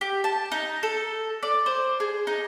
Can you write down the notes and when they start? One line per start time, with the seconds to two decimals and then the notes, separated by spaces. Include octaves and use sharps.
0.01 G4
0.24 A5
0.52 D#4
0.83 A4
1.43 D5
1.66 C5
2.00 G#4
2.27 D#4